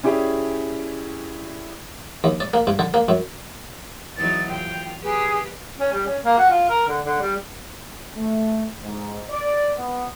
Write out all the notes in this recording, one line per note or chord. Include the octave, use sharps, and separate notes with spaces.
C#4 E4 G4 G#4 D5
D#2
D5
A#3
G2
D3
A#3
F#2
E2 F#3 D#4 A6
F4 G5
G4 G#4 B4
C#4
G3
C#4
A#3
F#4
F4
A#4
D3
D3
G3
A3
G#2
D5
B3